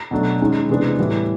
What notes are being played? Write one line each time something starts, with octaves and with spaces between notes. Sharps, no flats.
B2 F#3 A3 D4
D#3 G#3 C#4
C3 E3 G#3 B3 D4
A2 E3 G3 B3